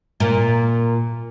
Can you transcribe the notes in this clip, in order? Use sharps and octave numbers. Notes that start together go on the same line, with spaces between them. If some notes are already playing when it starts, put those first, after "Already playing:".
A#2